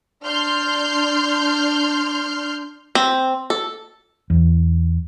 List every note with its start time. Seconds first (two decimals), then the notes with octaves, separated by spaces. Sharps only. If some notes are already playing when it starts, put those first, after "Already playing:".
0.23 D4 C6 F6 G6
2.95 C4
3.50 A4
4.30 E2